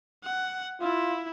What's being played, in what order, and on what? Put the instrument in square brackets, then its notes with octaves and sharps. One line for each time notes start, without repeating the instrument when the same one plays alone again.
[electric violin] F#5
[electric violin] E4 [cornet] F4